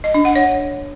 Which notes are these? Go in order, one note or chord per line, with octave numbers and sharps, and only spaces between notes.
D#5
D4
F#5
C#5